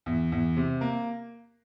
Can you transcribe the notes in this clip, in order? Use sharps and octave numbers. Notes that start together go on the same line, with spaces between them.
E2
E2
C3
A#3